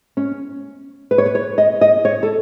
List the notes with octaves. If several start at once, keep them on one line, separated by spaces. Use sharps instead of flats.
C#4
B4
C#5
B4
C#5
D#5
D#5
C#5
A4